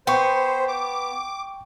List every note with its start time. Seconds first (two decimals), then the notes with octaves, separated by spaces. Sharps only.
0.07 B3 C5 G5 C#6
0.68 D6